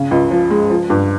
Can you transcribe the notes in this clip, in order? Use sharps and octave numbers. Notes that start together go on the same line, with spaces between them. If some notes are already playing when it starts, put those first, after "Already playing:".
Already playing: C#3
C#2
F3
G#3
F3
G2